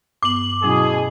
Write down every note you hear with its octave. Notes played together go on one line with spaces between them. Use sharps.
G2 B3 D6 F#7
B2 F#3 C#4 E4 G#4